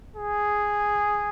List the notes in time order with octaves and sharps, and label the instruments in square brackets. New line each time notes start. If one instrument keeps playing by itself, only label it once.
[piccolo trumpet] G#4